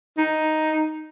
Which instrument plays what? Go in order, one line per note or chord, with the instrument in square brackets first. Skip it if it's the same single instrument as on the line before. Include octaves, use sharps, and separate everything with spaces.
[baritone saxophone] D#4